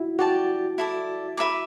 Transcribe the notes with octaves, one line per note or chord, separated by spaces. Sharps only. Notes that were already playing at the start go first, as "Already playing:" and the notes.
Already playing: E4 F#4
F#4 G4 D5 A5
E4 A4 D5
B4 E5 B5 D6